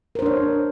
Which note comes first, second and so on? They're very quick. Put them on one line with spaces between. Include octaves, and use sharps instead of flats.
A#4 C5 D4 C#5